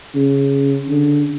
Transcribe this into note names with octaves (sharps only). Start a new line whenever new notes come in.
C#3
D3